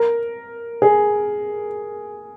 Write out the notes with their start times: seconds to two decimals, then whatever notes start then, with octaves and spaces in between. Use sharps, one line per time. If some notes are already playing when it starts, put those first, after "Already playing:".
Already playing: A#4
0.82 G#4